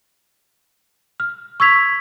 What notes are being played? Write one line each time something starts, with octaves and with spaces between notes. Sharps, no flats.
F6
C#6 E6 G#6 B6 F7